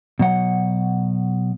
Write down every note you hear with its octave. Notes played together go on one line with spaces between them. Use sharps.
B2 F#3 F#5